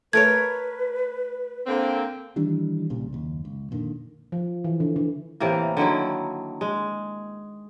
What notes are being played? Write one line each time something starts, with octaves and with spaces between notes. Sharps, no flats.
A3 A#4 B4 C#5 G#6
D3 A#3 C4
D#3 E3 G3 D4
C2 A#2 C#3 G3
F#1 D#2
C#2
F2 A#2 D3 D#3
F3
E3
D3
D3
A2 C3 E3 A#3
D3 D#3 F#3 E4
G#3